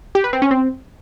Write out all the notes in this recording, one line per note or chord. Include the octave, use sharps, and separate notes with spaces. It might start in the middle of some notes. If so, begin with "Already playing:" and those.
G4
B4
C4
C#4
C4